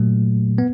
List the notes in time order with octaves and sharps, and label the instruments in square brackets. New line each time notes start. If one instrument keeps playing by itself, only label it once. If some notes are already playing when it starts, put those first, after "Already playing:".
Already playing: [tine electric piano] A#2 F#3 A3
B3